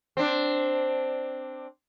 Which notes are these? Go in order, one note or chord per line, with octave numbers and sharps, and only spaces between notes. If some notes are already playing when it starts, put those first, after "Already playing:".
C4 D4